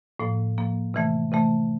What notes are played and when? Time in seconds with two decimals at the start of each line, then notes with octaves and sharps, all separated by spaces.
0.20 A2 F3 A#3
0.58 A2 F3 A#3
0.94 C3 E3 A3
1.32 C3 E3 A3